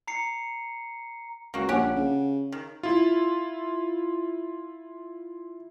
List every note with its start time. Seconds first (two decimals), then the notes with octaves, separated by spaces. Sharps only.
0.08 A#5 C7 C#7
1.54 C#2 A#3 F#4
1.69 A#1 C#4 G4 F#5
1.96 C#3
2.52 D#3
2.83 E4 F4